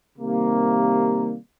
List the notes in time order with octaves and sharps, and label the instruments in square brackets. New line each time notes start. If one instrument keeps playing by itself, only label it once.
[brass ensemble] C3 D#3 G3 A#3